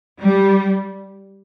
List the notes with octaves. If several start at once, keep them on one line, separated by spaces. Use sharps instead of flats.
G3